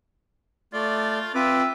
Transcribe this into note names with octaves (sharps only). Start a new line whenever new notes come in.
A3 F4 D5
C4 F4 B4 E5 D6